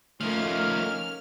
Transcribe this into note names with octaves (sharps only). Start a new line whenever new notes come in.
F3 A3 A#3 C#4 D#4 F6